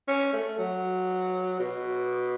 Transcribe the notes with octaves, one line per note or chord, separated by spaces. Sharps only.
C#4
A3
F#3
B2